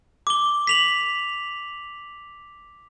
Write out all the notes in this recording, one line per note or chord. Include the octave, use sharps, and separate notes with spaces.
D6 G7
B6 F7 F#7